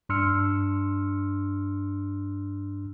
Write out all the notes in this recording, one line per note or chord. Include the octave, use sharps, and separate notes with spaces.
G2 D4 C6 E6 F6 C#7